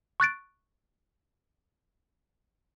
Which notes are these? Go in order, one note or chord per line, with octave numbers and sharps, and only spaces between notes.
C#6 F#6 A6 D7